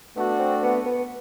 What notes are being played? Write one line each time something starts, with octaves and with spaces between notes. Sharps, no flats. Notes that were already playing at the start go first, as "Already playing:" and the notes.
A3 B3 D4 F#4
C4
B3
B3